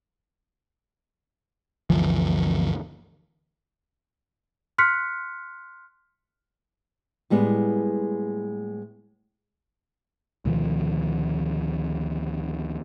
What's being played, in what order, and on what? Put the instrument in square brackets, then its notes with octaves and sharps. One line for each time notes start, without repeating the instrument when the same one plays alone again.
[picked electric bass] G1 D2 E3 F3
[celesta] C6 F6 F#6 B6 C#7
[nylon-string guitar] A2 G3 G#3 B3
[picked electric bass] D2 B2 D#3 F3